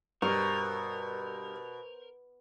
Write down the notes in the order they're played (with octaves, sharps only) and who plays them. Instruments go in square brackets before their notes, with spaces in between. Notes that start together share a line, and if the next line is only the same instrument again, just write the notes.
[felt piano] G2 [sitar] B2 [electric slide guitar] A#4 [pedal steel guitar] C5 C#6